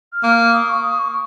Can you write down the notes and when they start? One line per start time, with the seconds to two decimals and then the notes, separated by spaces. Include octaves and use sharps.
0.12 F6
0.23 A#3
0.53 D#6
0.69 C#6
0.83 D#6
0.99 C#6